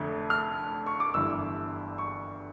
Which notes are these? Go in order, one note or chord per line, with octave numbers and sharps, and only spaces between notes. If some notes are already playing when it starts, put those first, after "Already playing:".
Already playing: F1 F2 D3 A3
F6
C#6
D6
G1 G2 E3 G3 E6
C#6